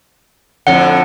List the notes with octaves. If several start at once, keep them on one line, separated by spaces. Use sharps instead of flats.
F2 A2 D3 F#5